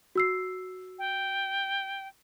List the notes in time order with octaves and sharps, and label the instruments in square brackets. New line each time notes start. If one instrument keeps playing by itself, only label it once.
[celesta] F#4 E6 C7
[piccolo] G5